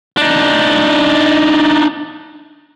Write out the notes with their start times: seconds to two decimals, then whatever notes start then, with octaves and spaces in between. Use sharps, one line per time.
0.17 D4 D#4